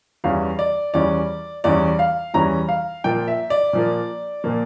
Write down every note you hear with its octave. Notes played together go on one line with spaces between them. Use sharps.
E2 E3 G3 C#4 F5
D5
E2 E3 G3 C#4 D5
E2 E3 G3 C#4 D5
F5
E2 E3 G3 C#4 A#5
F5
A#2 F3 A#3 G5
E5
D5
A#2 F3 A#3
A#2 F3 A#3